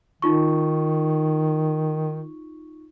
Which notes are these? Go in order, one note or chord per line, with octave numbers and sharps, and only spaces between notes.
D#3 D#4 F4 C#6